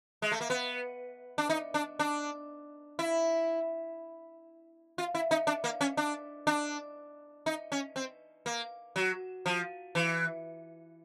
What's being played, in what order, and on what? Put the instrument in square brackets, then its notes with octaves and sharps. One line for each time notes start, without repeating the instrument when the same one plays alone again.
[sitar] G#3
A3
A#3
B3
D4
D#4
D4
D4
E4
F4
E4
D#4
D4
A#3
C#4
D4
D4
D#4
C#4
C4
A#3
F#3
F3
E3